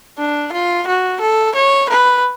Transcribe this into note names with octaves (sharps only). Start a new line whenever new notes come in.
D4
F4
F#4
A4
C#5
B4